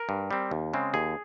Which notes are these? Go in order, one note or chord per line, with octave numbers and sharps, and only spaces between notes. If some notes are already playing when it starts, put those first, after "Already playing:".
Already playing: A#4
G2
G3 C4
D#2
C#3 G#3 C4
D#2 G#4